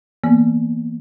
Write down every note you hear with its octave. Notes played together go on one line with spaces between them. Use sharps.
E3 A#3 B3